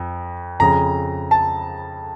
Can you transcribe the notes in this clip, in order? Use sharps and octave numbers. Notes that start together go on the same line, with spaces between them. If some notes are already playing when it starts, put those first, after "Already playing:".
Already playing: F2
F2 C#3 A#5
A5